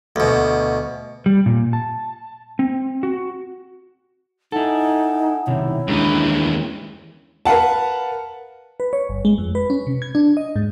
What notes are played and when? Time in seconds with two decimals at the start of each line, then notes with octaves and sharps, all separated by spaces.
0.16 D2 B2
1.26 G3
1.46 A#2
1.73 A5
2.59 C4
3.03 F#4
4.52 D#4 E4 A4 F#5 G#5
5.47 B1 C3 D#3 E4 C#5
5.88 D#2 E3 G#3 C#4 D4
7.45 A#4 B4 F5 F#5 A5
8.80 B4
8.93 C#5
9.09 G1
9.25 G#3
9.38 F2
9.55 B4
9.70 C#4
9.87 C3
10.02 G#6
10.15 D4
10.37 D#5
10.56 G#2